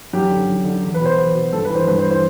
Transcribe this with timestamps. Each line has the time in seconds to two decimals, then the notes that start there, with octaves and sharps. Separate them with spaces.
0.13 F#2 G4
0.30 D3
0.47 F#2
0.65 D3
0.83 E2
0.94 B4
1.00 B2
1.05 C5
1.17 E2 B4
1.35 B2
1.52 G2 A4
1.65 B4
1.70 E3
1.75 C5
1.87 G2 B4
1.99 C5
2.05 E3
2.11 C5